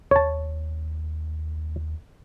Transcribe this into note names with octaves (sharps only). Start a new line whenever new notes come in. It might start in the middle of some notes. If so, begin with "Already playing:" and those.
D#2 C#5 A5